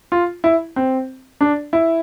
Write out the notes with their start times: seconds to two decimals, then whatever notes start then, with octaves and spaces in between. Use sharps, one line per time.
0.12 F4
0.44 E4
0.76 C4
1.41 D4
1.73 E4